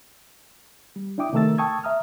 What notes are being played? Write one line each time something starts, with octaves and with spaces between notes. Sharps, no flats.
G3
D4 E4 G5 D6 D#6
C3 D#3 A3 A#4 E6 A6
G5 A5 C#6 D#6 E6 G#6
E5 A#5 D#6 F6